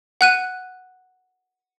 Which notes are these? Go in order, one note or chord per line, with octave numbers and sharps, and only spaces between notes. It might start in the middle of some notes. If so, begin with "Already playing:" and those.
F#5 F#6 D#7